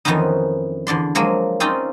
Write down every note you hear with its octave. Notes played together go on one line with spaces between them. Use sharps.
F2 D#3 E3 B3 C#4 D#4
E2 D3 D5 C6
F3 F#3 G#3 A#3
C4 C#4 D#4 F4 D5 G5